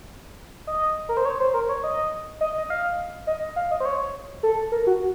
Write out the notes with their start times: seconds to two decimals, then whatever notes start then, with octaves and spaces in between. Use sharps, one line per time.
0.67 D#5
1.09 A#4
1.17 C5
1.25 C#5
1.40 C5
1.54 A#4
1.69 C#5
1.84 D#5
2.41 D#5
2.58 D#5
2.70 F5
3.27 D#5
3.56 F5
3.71 D#5
3.80 C5
3.85 C#5
4.43 A4
4.72 A#4
4.87 F#4